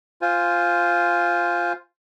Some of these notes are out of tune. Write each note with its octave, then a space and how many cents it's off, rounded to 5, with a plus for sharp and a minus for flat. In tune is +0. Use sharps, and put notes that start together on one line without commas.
F4 +0 C5 -5 G#5 +0